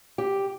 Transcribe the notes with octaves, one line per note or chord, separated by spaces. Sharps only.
G4